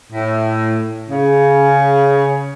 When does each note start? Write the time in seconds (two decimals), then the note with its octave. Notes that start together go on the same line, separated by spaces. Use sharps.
0.11 A2
1.09 C#3